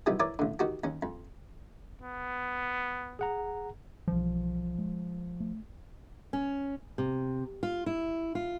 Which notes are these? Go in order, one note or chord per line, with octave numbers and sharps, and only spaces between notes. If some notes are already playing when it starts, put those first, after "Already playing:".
C3 D#3 E3 F#3 G3
E3 A#4 C#5 D5 D6
A1 D3
D#3 F#4 G4
D#2 C#4
F2
B3
G#4 F#5 A#5
B1 E3 F3 G3
G#3
A3
C#4
C3
F4
E4
F4